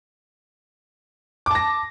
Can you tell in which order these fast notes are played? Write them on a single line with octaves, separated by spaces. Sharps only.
D6 A5 A#6